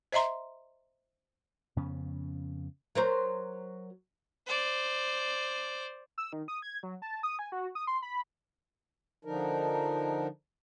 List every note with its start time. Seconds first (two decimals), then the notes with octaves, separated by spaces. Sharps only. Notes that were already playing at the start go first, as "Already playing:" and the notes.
0.12 C5 D#5 E5 A#5 C6
1.76 F2 C#3 B3 C#4
2.95 F#3 A#4 C5
4.46 C5 D5
6.18 E6
6.33 D#3
6.48 D#6
6.62 G#6
6.83 F#3
7.02 A5
7.23 D#6
7.39 G#5
7.52 F#4
7.75 D#6
7.87 C6
8.02 B5
9.25 D3 F3 D4 D#4 A#4